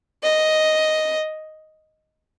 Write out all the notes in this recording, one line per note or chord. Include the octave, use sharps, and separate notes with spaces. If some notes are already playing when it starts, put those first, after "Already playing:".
D#5